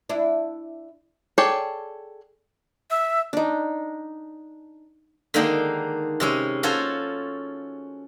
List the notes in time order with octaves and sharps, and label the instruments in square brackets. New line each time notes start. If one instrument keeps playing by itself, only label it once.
[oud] D4 E4
[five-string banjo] G#4 A4 C#5 D5 G5
[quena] E5
[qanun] D4 D#4
[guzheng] D3 D#3 G#3 A#3 D4 D#4
C3 G#3 C#4
C#4 F4 F#4 A4 C5 C#5